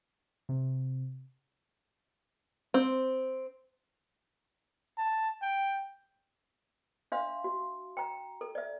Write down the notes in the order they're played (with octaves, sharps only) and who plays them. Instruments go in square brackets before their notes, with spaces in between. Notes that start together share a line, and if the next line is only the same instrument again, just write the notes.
[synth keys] C3
[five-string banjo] C4
[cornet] A5
G5
[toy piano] D4 E5 F5 C6
F#4
G5 A#5
A4
D5 E5